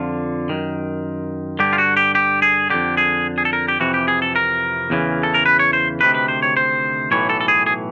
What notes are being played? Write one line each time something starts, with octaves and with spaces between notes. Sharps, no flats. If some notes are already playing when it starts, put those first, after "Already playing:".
Already playing: F2 D3 F4
F#2 D#3
G2 D3 G4
F4
F#4
G4
G4
G#4
F2 D3 G4
G#4
G#4
A4
A#4
G4
F2 C3 E3 F#4
G4
G#4
A4
A#4
E2 C#3 E3
A4
A#4
B4
C#5
C5
D2 C3 D#3 B4
B4
C5
C#5
C5
B1 A2 E3 C#5
A4
A4
G#4
G#4